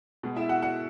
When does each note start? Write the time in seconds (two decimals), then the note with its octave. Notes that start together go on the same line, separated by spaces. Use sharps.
0.23 B2 G#3 B3
0.36 E4 E5
0.49 F#4 F#5
0.62 F#4 F#5